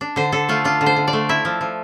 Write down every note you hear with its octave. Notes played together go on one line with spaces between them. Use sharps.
D4
D3 C5
D3 A4
A3 F4
D4 F4
D3
C5
D3
D5
A3
E4 E5
F3
F3